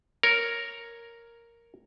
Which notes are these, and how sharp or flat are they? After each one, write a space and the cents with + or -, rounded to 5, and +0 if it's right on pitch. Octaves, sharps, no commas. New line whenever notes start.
A#4 +0 C#5 +0